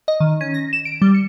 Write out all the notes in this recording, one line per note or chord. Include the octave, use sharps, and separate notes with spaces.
D#5
D#3
C#4
A#6
E7
D7
G3
C#7